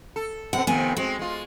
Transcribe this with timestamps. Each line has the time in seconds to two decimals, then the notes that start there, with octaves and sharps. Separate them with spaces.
0.16 A4
0.53 B2 C4 F#5
0.67 F2 C3 D#3 B3 G#5
0.97 G#3 C4 F#4
1.19 G#3 F4